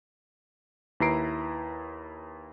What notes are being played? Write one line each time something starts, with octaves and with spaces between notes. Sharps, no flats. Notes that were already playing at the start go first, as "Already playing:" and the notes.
D#2 E4 B4 A#5 C7 D7